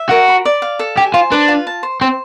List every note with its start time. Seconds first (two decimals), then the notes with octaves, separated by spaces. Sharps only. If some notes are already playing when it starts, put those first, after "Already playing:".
Already playing: E5
0.10 F#4 A#4
0.28 B5
0.45 D5
0.62 F5
0.79 A4
0.97 G4 G#5
1.14 F4 C5
1.31 D4 B4
1.48 F4
1.67 A5
1.83 C5
2.01 C4 C5